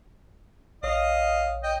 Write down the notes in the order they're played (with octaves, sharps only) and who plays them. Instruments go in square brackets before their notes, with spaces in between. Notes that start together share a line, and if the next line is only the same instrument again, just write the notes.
[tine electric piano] A#1 C#5 D#6 [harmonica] D#5 F5
[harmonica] D#5 G5